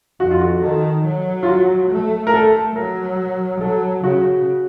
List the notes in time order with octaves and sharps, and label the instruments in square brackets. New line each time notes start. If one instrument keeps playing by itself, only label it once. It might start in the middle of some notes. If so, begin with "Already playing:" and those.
[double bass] F2 [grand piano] F#4
[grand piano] F4
F#4
[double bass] D#3 [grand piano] A4
[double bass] F#3
[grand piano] F4
F#4
[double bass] A3
[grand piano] A#4
[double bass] A3 [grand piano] A4
[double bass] F#3 [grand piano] A#4
[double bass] F#3 [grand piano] A4
[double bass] C#3 [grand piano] F#4